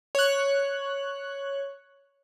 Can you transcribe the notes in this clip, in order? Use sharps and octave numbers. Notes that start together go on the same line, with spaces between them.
C#5 F#6